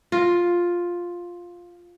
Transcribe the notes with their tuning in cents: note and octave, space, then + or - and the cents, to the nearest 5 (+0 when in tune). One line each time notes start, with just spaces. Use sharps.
F4 +5